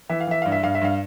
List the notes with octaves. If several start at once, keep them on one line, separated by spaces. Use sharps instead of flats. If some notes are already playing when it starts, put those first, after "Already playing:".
E3 E5
F5
E3 E5
G2 F5
E5
G2 F5
E5
G2 F5